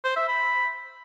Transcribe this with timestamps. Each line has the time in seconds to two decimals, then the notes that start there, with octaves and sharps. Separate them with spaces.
0.05 C5
0.16 E5
0.28 B5